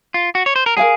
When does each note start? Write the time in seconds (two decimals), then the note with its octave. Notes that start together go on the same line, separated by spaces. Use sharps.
0.14 F4
0.35 F#4
0.46 C#5
0.56 C5
0.66 A#4
0.77 G#4 A#4 F5 G#5